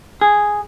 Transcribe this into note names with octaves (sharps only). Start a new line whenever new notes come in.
G#4